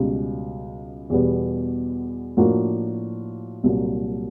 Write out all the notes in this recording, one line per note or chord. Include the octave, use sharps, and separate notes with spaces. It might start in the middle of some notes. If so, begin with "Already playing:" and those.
Already playing: C#2 B2 G3
E2 B2 G3 B3
A2 F3 A#3 D4 F#4
C2 A#2 F#3